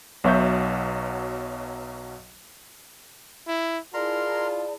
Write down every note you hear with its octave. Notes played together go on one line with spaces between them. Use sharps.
B1 B2 F#3 E5 C#6 G6
E4
E4 F4 G#4 A#4 D5 A5 A#5 C6